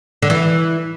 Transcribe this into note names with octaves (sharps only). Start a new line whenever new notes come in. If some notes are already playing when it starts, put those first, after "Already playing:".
D3
E3